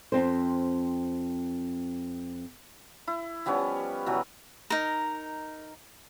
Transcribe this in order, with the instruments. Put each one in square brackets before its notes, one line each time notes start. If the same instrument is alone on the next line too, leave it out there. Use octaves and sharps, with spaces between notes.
[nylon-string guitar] F2 C4 C5
[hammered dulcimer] E4
F3 G3 B3 C#4
B2 E3 F#3
[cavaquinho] D#4 A#4